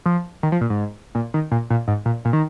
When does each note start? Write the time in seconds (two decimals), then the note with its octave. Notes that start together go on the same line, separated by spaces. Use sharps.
0.06 F3
0.43 D#3
0.52 F3
0.61 A#2
0.70 G#2
1.15 A#2
1.34 D#3
1.51 A#2
1.70 A#2
1.88 G#2
2.06 A#2
2.25 A#2
2.33 D#3